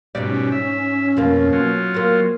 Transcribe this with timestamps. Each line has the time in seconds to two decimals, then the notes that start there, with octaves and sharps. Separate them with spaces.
0.15 G#2 B2 G3 C#4 D5
0.52 E5
1.17 F2 B2 A#3
1.53 F#3 F4
1.94 A#3 C4